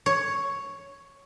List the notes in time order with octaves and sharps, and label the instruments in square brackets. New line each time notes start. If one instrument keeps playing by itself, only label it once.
[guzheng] C#5